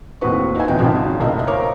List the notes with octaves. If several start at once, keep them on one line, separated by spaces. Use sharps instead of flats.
D#2 A2 C4 F#4 B4 C#6
D#4 F#4 C5 E5 G#5
G1 F2 D#3 F#3 F#4 G5
G#1 C#3 F#3 D#4 F4 A5
F#1 C#2 A3 D#5 E5
A#4 C5 C#5 F5 A#5 D6